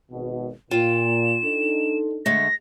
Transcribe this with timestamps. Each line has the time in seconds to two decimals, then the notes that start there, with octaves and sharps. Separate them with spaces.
0.12 G#1 B2
0.71 A#2 F4 G5 E7
1.44 D4 D#4 A4
2.26 D3 G#3 A3 A#6